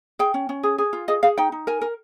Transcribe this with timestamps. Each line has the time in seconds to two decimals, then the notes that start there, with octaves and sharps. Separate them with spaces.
0.19 G#4 G5
0.34 C#4
0.49 C#4
0.63 G#4
0.78 G#4
0.93 F4
1.08 G#4 D#5
1.23 G#4 F5
1.38 D#4 G5
1.52 D#4
1.67 A#4 G#5
1.81 A#4